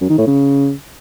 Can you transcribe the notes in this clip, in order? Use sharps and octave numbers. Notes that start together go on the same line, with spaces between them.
F#2
D#3
A2
C#3